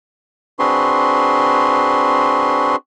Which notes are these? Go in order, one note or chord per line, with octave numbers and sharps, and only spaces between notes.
C4 D4 F#4 G#4 B4 C6